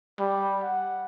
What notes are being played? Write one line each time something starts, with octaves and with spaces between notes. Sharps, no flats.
G3
F#5